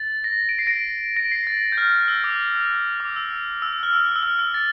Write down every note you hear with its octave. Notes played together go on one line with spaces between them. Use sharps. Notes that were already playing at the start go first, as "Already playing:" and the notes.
Already playing: A6
A#6
D7
C7
A#6 D7
A#6 D7
C7
A6
G6
F6
E6
D6
D6
E6
E6
E6
F6
E6
E6
F6
E6
A6